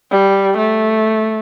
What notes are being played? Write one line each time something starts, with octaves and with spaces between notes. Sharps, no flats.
G3
A3